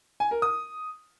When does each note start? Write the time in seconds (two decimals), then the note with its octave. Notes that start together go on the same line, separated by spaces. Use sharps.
0.20 G#5
0.31 A#4
0.42 D#6